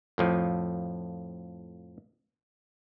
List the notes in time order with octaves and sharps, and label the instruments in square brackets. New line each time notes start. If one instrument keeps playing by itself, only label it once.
[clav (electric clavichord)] F2 A2 F3